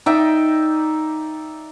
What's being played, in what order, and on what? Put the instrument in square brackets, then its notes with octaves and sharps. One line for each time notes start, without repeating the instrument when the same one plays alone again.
[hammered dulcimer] D#4 D5 E5 G5